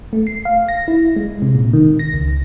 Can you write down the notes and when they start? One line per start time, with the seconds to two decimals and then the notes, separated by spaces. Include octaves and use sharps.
0.13 A3
0.27 C7
0.45 F5
0.68 A#6
0.88 E4
1.16 G#3
1.42 C3
1.55 A#2
1.73 D#3
1.99 A#6
2.14 C#2